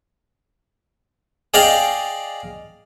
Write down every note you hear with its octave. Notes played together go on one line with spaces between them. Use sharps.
G#4 D5 D#5 F5 G5